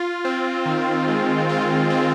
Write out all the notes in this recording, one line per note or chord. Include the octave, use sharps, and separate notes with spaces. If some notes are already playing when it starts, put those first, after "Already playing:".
Already playing: F4
C4
D#3
G#3
F4
C4